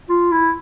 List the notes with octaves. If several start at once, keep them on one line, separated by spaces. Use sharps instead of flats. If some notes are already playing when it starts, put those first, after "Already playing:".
F4
E4